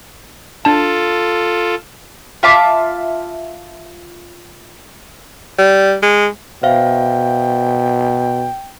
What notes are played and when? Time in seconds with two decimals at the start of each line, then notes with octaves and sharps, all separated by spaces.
0.65 D4 F4 A4 A5
2.43 F4 E5 A5 D6
5.59 G3
6.03 G#3
6.63 B2 C5 E5 F5 G5